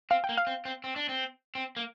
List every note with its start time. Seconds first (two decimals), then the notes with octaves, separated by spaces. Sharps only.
0.10 C4 F5
0.24 G5
0.29 A#3
0.37 F5
0.47 C4
0.65 C4
0.84 C4
0.96 D4
1.09 C4
1.55 C4
1.77 A#3